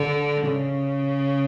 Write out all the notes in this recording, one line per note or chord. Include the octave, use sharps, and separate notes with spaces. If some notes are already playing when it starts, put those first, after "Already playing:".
Already playing: D3
C#3